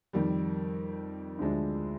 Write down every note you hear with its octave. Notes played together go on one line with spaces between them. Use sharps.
F2 D#3 G3
D2 D3 F3 G#3 D4